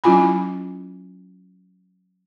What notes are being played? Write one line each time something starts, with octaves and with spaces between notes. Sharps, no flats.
F#3 C#4 E4 F4 G#5 B5